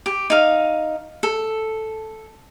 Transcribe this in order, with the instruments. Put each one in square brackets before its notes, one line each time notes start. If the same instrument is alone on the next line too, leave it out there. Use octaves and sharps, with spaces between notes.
[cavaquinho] G4
D#4 F5
A4